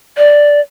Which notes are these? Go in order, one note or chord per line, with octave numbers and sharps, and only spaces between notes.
D5